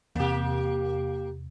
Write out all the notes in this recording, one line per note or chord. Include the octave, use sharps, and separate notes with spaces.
E2 C3 A#3 G4